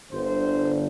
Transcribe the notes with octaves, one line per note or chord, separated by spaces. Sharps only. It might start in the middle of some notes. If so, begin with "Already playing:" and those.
G1 G2 D3 C5